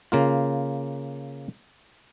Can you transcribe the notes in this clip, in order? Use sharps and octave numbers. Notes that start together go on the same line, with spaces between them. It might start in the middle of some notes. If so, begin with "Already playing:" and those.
C#3 A#3 F4